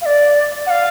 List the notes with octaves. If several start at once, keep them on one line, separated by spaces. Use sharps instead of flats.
F5
D5
F#5
F5